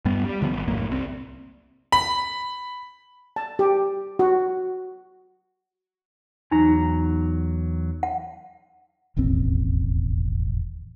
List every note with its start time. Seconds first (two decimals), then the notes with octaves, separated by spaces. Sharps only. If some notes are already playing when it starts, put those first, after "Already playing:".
0.05 G2 G3 B3
0.25 G3
0.41 C#2 D3 F3 B3
0.53 G#1
0.68 B1 F#2 A2 A#3
0.91 C2 C4
1.92 B5
3.36 A5
3.59 G4
4.19 F#4
6.51 E2 F#3 D#4 A#5
8.03 F#5
9.17 E1 A1 D#2 C4